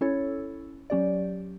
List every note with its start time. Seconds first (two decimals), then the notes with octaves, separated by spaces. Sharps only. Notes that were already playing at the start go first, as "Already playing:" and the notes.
0.01 C#4 E4 A4 C#5
0.90 F#3 C#4 G4 D5